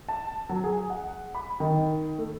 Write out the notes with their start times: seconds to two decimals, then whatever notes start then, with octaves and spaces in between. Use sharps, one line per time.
0.09 A5
0.49 F#3
0.64 G#4
0.90 F#5
1.35 B5
1.60 D#3
2.18 A3